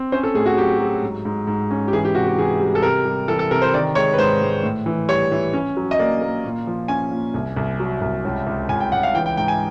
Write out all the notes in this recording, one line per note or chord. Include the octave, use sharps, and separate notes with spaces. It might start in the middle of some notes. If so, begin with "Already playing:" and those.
Already playing: C4
C#4 C5
A4
A2 G#4
F#4
F#3 G4
F#3
G#2
G#2
G#2
C#4
G4
E3 G#4
G4
C3 F#4
G4
E3 G#4
G3
A4
C3 A#4
G3
E3 A4
A4
C3 A#4
C5
D#3 D5
G#3 C#5
B4
G#2 C5
G#3
A2
E3
G3 C#5
E3
C#4
F#3
D#5
A#3 D5
A#3
A#2
F3
C#4 G#5
A#2
C2
C2
F#3
C2
C#2
C#2
C#2 G#5
G5
C#2 F#5
F5
E3 G5
G5
G#2 G5
G#5